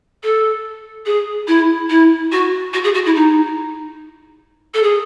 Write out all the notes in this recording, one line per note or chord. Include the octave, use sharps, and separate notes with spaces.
A4
G#4
E4
E4
F#4
F#4
G#4
F#4
E4
D#4
A4
G#4